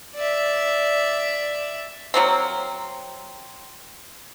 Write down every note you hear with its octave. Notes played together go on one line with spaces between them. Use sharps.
D5 E5
F#3 A#3 C4